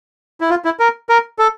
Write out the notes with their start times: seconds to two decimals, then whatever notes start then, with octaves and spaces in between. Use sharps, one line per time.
0.41 E4
0.50 F4
0.65 E4
0.79 A#4
1.09 A#4
1.39 A4